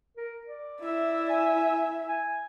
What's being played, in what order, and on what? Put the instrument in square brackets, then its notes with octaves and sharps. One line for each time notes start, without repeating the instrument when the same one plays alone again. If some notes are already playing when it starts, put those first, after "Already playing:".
[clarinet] A#4
D5
[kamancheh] E4 E5
[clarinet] G#5
G#5